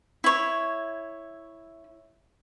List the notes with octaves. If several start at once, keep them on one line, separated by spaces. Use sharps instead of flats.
E4 C#5